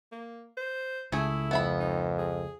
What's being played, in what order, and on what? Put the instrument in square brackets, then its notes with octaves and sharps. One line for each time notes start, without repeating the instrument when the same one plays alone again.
[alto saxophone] A#3
C5
[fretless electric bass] C#2 [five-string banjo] A3 G#4 [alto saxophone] E4
[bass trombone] F2 [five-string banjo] B3 E5 B5
[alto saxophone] D#4
G#4